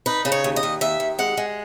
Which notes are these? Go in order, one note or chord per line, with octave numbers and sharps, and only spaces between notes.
D#4 B4
C#3 B4
C#5
D#2
D#5
D#2
D#2 E5
D#2
G#3 F#5
G#3